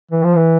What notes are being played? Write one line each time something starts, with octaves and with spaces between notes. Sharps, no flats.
E3
F3
E3